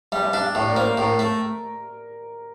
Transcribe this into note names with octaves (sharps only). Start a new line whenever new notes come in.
G3 E5
E5
D4 E5
F5
A2 E5
D5
A#4
A#3 C5
A#4
A2 A#4
A3